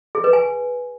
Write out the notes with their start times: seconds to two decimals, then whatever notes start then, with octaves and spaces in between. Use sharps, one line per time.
0.15 G#4
0.24 B4
0.33 G#5